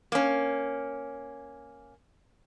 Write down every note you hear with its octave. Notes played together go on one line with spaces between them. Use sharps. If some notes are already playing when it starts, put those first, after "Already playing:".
A#3 C#4